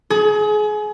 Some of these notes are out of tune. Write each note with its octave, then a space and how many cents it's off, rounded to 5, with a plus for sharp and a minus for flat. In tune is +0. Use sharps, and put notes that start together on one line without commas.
G#4 +30